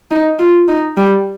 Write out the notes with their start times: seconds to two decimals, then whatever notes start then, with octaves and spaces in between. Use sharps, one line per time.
0.11 D#4
0.39 F4
0.68 D#4
0.97 G3